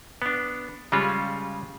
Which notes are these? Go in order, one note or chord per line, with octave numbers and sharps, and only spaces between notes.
B3 D4
C#3 G3 G#3 C#4 F4